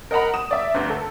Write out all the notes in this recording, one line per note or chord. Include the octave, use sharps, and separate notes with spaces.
A#4 D#5 F#5 A#5 B5
D#6 E7
D5 E5
G1 D2
A4